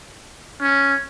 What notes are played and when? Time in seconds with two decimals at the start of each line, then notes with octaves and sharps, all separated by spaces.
0.61 C#4